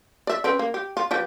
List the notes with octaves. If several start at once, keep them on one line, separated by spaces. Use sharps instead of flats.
D5 E5
C4 C#4 B4
A#3
G4
F4
F3 B3 G4